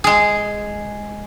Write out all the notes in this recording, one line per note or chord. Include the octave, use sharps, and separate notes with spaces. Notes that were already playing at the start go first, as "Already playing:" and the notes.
G#3 G#4